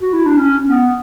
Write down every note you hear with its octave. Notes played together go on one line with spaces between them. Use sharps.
F#4
E4
D4
C#4
B3